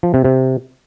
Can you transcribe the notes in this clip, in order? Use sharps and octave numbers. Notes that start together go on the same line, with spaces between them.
F3
C3
C3